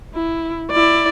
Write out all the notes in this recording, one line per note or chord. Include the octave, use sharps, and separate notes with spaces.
E4
E4 D5